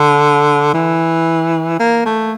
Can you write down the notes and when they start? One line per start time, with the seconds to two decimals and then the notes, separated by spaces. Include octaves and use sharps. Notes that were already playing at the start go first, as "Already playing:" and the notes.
Already playing: D3
0.74 E3
1.80 A#3
2.06 A3